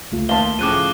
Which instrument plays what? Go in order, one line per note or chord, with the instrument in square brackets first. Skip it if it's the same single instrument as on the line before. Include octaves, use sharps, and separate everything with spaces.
[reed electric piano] C#2 A3 F4
[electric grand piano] D#2 C6 [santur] F5 A5 [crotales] G7
[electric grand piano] A2 C#3 F3 [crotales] D6 F#6 D#7